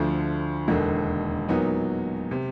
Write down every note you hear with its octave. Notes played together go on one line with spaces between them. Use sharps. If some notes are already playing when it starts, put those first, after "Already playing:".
Already playing: D2 D3 F3 A3
E1 D#2 D3
A#2 F#3 B3 D#4
C3